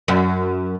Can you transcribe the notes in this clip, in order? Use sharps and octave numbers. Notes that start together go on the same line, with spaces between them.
F#2